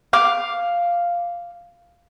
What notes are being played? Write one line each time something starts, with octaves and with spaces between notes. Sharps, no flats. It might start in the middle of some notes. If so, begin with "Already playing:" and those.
F5 D6